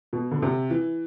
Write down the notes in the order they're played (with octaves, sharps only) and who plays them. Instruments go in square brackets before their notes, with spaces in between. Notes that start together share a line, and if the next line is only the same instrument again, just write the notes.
[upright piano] B2
D3
C3
E3